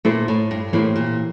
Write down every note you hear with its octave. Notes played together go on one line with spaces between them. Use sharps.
A#2 A3 E4 A4 C5
A2
G2
A2 E3 A#3 E4 G4 C5
A#2